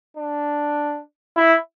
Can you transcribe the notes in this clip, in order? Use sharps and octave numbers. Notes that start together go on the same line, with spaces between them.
D4
E4